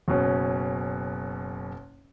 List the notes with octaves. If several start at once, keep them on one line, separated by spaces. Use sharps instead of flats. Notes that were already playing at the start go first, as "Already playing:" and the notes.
F#1 B2 C#4